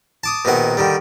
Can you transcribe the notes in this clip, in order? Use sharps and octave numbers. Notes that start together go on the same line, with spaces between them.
A5 D6 D#6
A#1 B2 D#3 B3 F#5
D3 D#3 G3